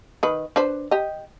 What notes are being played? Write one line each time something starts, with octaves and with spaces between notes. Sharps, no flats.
D#3 B4
D4 B4 C5
G4 D#5